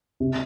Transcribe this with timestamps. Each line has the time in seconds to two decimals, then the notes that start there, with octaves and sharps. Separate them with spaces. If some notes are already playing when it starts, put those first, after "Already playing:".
0.20 C3